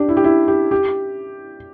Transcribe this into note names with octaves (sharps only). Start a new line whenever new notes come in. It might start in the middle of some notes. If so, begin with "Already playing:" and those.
Already playing: D4 G4
E4
G4
E4
G4
G4